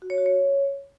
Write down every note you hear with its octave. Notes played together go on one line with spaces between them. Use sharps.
F#4
C#5
F#4
C#5